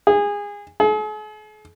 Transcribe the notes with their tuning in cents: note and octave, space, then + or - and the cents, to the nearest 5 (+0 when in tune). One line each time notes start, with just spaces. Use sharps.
G#4 -25
G#4 +45